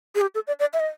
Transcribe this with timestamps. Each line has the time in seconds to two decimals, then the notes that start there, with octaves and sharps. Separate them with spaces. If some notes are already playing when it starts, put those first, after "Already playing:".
0.15 G#4
0.21 G4
0.35 A4
0.47 D5
0.60 D5
0.73 E5
0.80 D#5